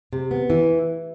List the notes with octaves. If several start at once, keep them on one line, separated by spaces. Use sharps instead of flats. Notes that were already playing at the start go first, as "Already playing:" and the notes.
C3
B3
E3